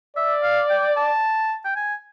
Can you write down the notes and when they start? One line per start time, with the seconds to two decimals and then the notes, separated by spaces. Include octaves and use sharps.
0.16 D5 E5
0.43 F5
0.70 G5
0.97 A5
1.65 G5
1.76 G#5